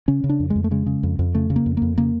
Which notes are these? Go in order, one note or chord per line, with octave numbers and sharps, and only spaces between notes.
C#3 C#4
C#3
D4
F2
G#3
F2
A3
C#3 G#3
C#3
F2
F2
C#3 A3
C#3
A#3
F2
F2 A#3
C#3 A#3